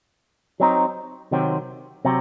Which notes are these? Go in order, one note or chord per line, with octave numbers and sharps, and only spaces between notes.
F#3 C4 D#4
C3 D#3 F#3 C4
C3 F#3 C4